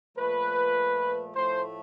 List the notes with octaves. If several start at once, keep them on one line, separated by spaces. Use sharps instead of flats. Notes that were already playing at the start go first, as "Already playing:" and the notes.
A#2 F3 A3 B4
A2 F3 A3 C5